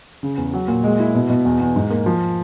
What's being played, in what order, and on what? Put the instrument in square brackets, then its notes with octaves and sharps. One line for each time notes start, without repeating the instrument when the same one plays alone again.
[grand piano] C#3
E2
F#3
A#2
G#3
E4
B2
B2
E2
E2
G#2
A#3
F3